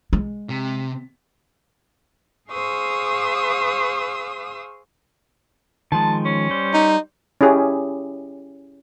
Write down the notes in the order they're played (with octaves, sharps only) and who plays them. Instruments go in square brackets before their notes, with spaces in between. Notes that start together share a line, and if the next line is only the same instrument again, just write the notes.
[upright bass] G#3
[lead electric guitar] C3
[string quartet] G#4 C5 F5 C#6 D#6 E6
[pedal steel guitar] D#3 F3 G#3 [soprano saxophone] A5
[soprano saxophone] C#4
[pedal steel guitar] G3 C5
[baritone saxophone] D#4
[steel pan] C#4 E4 G4 G#4